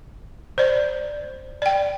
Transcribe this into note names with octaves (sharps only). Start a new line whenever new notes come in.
C5 D5
D5 G5